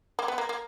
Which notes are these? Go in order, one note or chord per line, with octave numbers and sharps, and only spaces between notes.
A#3
B3
A#3
A#3